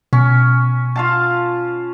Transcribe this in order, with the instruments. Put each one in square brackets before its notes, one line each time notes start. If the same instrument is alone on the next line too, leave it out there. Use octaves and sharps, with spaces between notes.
[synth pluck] B2 [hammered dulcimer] C#4
[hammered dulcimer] F4 F5 A5